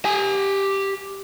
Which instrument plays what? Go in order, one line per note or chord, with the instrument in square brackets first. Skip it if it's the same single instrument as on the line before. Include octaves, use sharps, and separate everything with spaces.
[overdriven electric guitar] G4 G#5